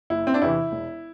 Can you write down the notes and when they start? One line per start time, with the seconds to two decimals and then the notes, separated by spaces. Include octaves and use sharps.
0.10 F#1 E4
0.27 C4
0.34 D4
0.42 E2 C3 E3 E4
0.72 E1